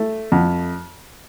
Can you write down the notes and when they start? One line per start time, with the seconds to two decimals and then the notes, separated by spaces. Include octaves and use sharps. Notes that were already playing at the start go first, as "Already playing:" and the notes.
Already playing: A3
0.32 F2